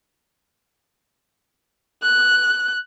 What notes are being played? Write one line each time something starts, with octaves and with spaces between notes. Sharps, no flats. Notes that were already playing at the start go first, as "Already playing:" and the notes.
F#6